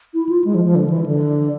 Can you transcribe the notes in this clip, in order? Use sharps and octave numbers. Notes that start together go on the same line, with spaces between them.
E4
F4
G#3
F3
F3
D3
E3
D3